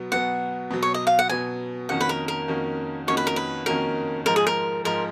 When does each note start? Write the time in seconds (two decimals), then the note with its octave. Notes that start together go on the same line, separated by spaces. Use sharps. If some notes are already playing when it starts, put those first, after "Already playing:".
Already playing: B2 F#3 B3
0.12 B2 F#3 B3 F#5
0.71 B2 F#3 B3
0.83 C#5
0.94 D#5
1.07 F5
1.19 F#5
1.29 B2 F#3 B3 G#5
1.89 F2 D#3 A#3 C#4 F#4 F#5
2.01 B4
2.09 A#4
2.28 A#4
2.48 F2 D#3 A#3 C#4 F#4
3.07 F2 D#3 A#3 C#4 F#4 C#5
3.17 B4
3.27 A#4
3.36 B4
3.66 F2 D#3 A#3 C#4 F#4 A#4
4.26 G#2 F3 G#3 A#4
4.36 G#4
4.47 A#4
4.84 G#2 F3 G#3 A#4